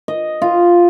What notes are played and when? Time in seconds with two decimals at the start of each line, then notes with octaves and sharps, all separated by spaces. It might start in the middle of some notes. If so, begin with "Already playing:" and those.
0.08 D#5
0.42 F4